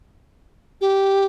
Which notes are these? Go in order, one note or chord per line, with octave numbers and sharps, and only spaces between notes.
G4